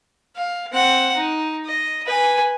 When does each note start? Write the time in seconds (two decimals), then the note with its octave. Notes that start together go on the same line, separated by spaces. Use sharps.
0.36 F5
0.72 C4 F#5
1.15 D#4
1.65 D#5
2.06 B4 G#5